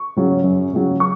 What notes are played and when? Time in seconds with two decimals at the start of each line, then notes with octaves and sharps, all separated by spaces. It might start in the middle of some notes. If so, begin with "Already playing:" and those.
Already playing: C#6
0.16 C#3 F#3
0.44 F#2
0.73 C#3 F#3
1.00 C#6